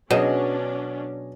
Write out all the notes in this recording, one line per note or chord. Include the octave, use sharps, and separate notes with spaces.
B2 F#3 C#4 D4 G#4 D#5